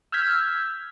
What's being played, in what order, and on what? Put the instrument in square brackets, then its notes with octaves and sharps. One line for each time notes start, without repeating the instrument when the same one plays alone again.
[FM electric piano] E6 F6 G6 G#6 B6